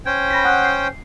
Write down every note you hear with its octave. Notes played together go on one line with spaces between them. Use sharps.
C#4 C5 G5 G#6
B5 A#6 B6
F#5 D#6 F#6
C7